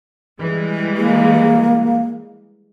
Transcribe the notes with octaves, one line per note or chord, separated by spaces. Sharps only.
E3 G3 G#3
A#3